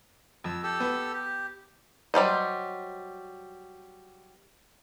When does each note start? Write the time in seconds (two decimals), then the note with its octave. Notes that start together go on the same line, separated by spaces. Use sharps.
0.44 F2 E6
0.63 G4 A4 E6
0.80 B3
1.13 G4
2.14 F#3 G3 C5 D#5